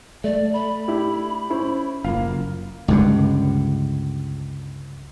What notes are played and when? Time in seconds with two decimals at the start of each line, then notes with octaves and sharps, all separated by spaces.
0.24 A3 D5
0.53 B5
0.88 D4 E4 G4
1.50 C#4 E4 C5
2.04 F#1 A#3 F4 F5
2.88 C#2 G2 D3